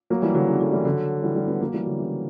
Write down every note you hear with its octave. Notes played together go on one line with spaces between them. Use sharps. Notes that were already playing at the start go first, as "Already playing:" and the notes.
F#3 A#3
E3 G3
D3 F#3
C#3 E3
D3 F#3
E3 G3
D3 F#3
E3 G3
E3 G3
G3 B3
F#3 A#3
E3 G3
D3 F#3
C#3 E3